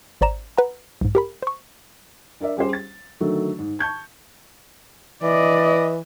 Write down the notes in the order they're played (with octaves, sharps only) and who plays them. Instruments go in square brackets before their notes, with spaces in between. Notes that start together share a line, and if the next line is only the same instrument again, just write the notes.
[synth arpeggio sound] G#1 C5 D5 A#5 E7
B4 F#5 A#5
B1 G#2
G4 A#4 B5
C5 C#6
[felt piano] D4 A#4 D5 E5
G3 C#4 G4 G#4 C5
A6
D3 D#3 F#3 A3
G#2
A5 C#6 G6 G#6
[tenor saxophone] E3 [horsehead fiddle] D5 D#5